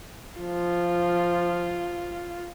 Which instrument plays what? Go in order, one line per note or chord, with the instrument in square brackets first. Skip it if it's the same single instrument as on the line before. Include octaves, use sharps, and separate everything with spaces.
[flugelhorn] F3 [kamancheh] F4